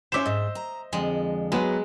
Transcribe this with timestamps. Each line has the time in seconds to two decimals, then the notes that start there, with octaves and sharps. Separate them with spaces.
0.12 C#4 C5 E5 D6 E7
0.26 G#2 D#5
0.55 A#5
0.93 F2 D3 F3 G#3
1.52 F#3 G#3 B3 B4